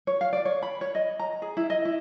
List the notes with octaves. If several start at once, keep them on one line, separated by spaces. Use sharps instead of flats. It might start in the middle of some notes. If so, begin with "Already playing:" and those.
C#5
F5
D5
C#5
B5
C#5
D#5
A#5
G#4
E4
D#5
E4